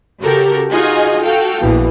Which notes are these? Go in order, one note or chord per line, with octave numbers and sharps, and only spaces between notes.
C#3 F#4 G4 A4 A#4
D#4 F4 F#4 G#4 D#5 G#5
F#4 A4 F5 G5
A#1 B2 E3